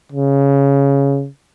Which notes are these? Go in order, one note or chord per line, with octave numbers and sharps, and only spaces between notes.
C#3